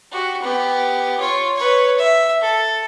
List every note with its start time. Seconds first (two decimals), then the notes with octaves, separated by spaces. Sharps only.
0.11 F#4 G4
0.42 B3 G4
1.20 F4 C#5
1.56 B4 C#5
1.98 E5
2.41 A4